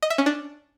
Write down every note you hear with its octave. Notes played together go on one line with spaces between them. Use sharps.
D#5
E5
C#4
D4